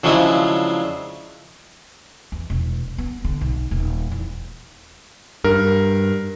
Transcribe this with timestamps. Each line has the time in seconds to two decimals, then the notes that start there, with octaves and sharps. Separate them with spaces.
0.04 C#3 F3 F#3 G#3 D4 E4
2.32 E2
2.50 E1
2.98 B3
3.25 D3
3.41 B1
3.71 D#1
4.11 E2
5.44 G2 A#4